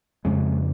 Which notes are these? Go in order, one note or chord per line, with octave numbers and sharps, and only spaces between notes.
F2 C#3 G#3